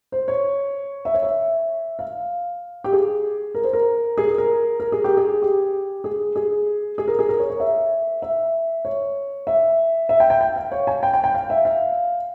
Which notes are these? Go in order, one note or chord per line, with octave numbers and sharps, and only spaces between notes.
C5
C#5
E5
C#5
E5
F5
G4
G#4
A#4
C5
A#4
G#4
A#4
A#4
A#4
G#4
G4
G#4
G4
G#4
G#4
G#4
A#4
G#4
A#4
C#5
C#5
E5
E5
C#5
E5
E5
G5
G5
G5
F5
C#5
G#5
G5
G5
G5
F5
E5
F5